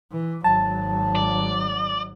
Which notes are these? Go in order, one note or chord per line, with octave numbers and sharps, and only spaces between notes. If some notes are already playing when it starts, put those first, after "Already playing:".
E3
G#1 F#3 A5
D5